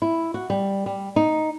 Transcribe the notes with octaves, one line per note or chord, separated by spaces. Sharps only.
E4
F#4
G3
G3
D#4